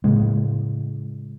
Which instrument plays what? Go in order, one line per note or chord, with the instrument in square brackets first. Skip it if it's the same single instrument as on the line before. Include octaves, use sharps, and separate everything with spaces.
[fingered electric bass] A2 C#3 G#3